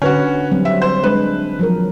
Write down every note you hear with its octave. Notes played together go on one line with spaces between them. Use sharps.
D3 C#4 F#4 B4 F#5
F#3 G3 C4
E5
C5
G#3 D4 B4
F3 F#3 A#4